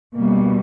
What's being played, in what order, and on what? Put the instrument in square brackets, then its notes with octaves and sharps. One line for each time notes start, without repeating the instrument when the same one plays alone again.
[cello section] B2 G3 A#3